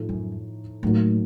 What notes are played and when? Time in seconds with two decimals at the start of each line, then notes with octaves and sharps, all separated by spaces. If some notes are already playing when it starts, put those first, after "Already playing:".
Already playing: A2 F3 A3 D#4
0.09 F#2
0.83 A2 D#3 F#3 A#3